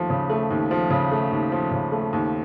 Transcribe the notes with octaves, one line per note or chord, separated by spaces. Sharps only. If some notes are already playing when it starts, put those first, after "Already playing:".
Already playing: D#2 F3 A3
C#3
A3
D#2
F3
C#3
A3
D#2
F3
C#3
A3
D#2